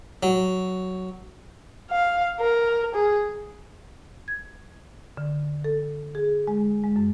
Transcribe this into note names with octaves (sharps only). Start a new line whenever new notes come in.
F#3
F5
A#4
G#4
G#6
D3
A4
G#4
G#3
G#3
F#2